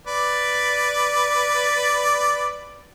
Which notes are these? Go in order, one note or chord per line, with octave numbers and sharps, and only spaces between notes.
B4 D5